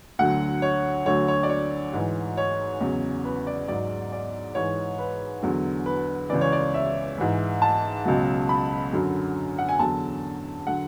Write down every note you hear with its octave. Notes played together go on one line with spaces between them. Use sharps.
D2 D3 F#3 F#5
C#5
D2 D3 F#3 C#5
C#5
D5
C#5
G#2 E3
C#5
E2 C#3 F#3
B4
D5
G#2 F#3 D5
D5
G#2 E3 C#5
B4
E2 D3 F#3
B4
C#2 C#3 E3 D5
C#5
D5
E5
G#2 E3
A5
C#2 B2 F#3
B5
F#2 D3 F#3
F#5
G#5
E2 D3 F#3 A5
D3 F#3 F#5